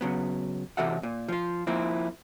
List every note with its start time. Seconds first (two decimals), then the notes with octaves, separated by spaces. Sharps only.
0.01 C#3 F#3 B3
0.77 C3 E3 F#4 A4 E5 F#5
1.03 A#2
1.28 F3 F4
1.67 F3 A#3 C4 E4